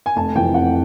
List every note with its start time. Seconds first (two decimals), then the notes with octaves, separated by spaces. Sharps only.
0.06 G#5
0.16 F1 A5
0.35 F2 C3 E3 G5
0.54 F1 F#5